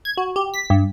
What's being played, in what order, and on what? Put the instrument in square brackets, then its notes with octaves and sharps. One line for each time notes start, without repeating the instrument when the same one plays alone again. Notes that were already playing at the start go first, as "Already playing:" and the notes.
[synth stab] G#6
F#4
G4
B6
G2